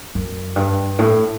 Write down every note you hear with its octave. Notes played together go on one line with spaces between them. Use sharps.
F#2
G2
A2